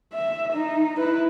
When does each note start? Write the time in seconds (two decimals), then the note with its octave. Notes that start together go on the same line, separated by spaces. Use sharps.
0.14 E5
0.53 D#4
0.98 E4 B4